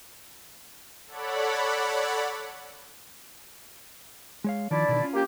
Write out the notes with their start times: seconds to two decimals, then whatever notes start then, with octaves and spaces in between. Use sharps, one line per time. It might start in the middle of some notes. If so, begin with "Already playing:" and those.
1.07 A4 C#5 D5 F#5 B5
4.44 G#3 C#5 F5
4.71 D#3 F3 D4 E4 D5
4.88 B2 D3 D#3
5.02 C#4 F4
5.14 A#3 G4